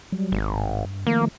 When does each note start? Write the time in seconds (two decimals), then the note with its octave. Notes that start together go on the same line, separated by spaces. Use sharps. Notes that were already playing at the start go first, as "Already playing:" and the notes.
0.12 F#3 G3
0.32 G#1
0.48 G2
1.07 D#3 F3 A3 A#3